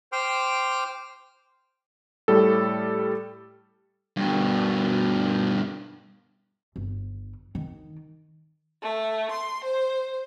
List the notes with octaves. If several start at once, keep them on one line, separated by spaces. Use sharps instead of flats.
C5 G5 C6 D6 F6
A2 G3 A4
G2 B2
G1
D#3
A3
C6
C5